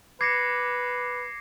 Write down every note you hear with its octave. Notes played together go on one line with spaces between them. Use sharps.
B4 D6 G#6 A#6 C7 C#7